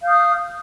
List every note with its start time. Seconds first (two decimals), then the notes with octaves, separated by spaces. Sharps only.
0.01 F5
0.03 G6
0.06 F6
0.08 D#6